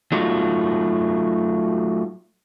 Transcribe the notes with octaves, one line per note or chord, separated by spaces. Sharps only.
F#3 A3 D#4 F4 F#4